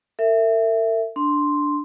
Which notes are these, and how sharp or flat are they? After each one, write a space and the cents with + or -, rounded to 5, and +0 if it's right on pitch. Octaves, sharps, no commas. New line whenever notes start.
A#4 -45 E5 +5
D4 +0 C6 +0